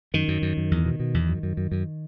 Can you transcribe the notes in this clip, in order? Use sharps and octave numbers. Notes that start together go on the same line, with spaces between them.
F#2 D#3
F#2
F#2
F#2
E2
B2
B2
E2
F#2
F#2
F#2
F#2